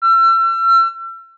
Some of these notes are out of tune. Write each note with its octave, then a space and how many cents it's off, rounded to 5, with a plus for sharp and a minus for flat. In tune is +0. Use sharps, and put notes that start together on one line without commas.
E6 +40